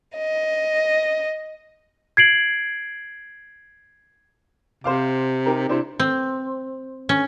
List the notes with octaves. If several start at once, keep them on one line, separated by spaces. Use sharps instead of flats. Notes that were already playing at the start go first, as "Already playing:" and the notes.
D#5
G#6 C7 D7 F#7
C3 C5 F5 D6
D#4 G4 A#4
C3 D4 E4 C5
C4
C#4